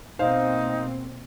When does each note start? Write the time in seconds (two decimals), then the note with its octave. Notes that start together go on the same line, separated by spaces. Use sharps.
0.19 B2 A#3 C4 D#4 C5 F5